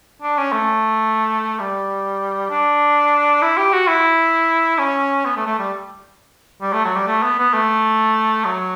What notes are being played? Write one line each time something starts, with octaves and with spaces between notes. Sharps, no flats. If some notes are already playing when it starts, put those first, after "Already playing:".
D4
C#4
A3
G3
D4
E4
G4
F#4
E4
C#4
B3
A3
A3
G3
G3
A3
F#3
G3
A3
B3
B3
A3
F#3